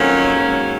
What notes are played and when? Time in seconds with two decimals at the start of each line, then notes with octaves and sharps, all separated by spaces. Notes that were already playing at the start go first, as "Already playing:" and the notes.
Already playing: F2 D#3 F#3 A#3 C#4
0.33 G#2 D#3 F#3